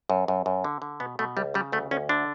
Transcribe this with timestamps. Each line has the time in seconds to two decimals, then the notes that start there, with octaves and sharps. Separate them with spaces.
0.10 F#2
0.28 F#2
0.46 F#2
0.64 D3
0.82 D3
1.00 B2 B3
1.19 B2 A3
1.37 C#2 G3
1.54 C#3 G3
1.72 D2 A3
1.91 D2 C#4
2.09 D3 D4